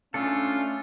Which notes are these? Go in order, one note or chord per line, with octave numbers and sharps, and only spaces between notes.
A3 C#4 D4 F4 A4